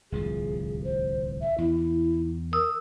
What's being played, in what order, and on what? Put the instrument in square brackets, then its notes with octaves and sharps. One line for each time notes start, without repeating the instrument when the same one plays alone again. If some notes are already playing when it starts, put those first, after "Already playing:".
[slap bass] D1 C2 F3 [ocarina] G#4
[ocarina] C5
E5
[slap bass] E2 [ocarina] E4
[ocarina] A#4 [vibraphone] D#6 E6